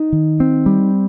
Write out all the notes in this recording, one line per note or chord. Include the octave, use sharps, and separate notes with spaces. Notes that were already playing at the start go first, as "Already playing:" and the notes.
Already playing: D#4
D#3
C4
G3